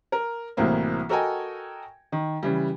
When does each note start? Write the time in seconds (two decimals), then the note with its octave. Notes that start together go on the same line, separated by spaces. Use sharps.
0.12 A#4
0.57 C2 A2 E3 F#3 A#3 C4
1.09 F#4 A4 A#4 D#5 G5 G#5
2.12 D#3
2.43 C#3 E3 G3